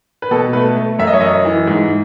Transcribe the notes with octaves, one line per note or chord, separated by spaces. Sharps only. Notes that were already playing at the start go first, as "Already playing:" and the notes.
B4
B2 A4
A3 B4
A3
F#2 E5
D#5
C#5
F#2 D#5
E3
G#2